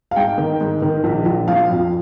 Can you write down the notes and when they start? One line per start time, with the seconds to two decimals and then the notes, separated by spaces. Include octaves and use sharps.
0.11 F5
0.16 G#2 G5
0.38 D#3
0.61 G#2
0.82 D#3
1.04 A#1
1.26 A#1
1.48 F3 F5
1.70 F2